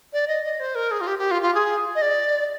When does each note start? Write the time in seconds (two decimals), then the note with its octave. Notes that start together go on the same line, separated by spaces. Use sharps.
0.13 D5
0.28 D#5
0.44 D#5
0.60 C5
0.75 A#4
0.91 G#4
1.01 F4
1.07 G4
1.19 G4
1.31 F4
1.42 F4
1.55 G#4
1.95 D#5
2.02 D5